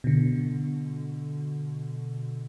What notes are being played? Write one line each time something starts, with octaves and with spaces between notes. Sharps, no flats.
B2 D3